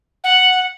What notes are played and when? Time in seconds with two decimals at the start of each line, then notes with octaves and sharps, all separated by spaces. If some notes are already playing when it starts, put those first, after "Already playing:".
0.24 F#5